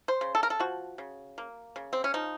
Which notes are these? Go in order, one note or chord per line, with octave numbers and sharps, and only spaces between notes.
C5
C#3
A4
A#4
A4
F3 F#4
C#3
A#3
C#3
C4
C#4
F3 D#4